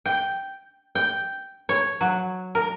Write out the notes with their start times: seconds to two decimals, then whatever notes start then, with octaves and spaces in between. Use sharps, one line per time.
0.06 G5
0.95 G5
1.69 C#5
2.01 F#3
2.55 A#4